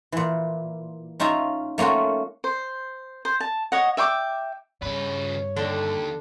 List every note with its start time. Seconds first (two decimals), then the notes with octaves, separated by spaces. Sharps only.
0.12 A#2 E3
1.20 C#4 D#4 F4 E5 A#5
1.78 A3 A#3 C#4 F4 F#4
2.44 C5
3.25 C5
3.40 A5
3.72 C#5 D#5 F#5
3.97 E5 G5 C6 D6
4.82 G2 C#3 B4 C#5
5.56 D#2 D3 D4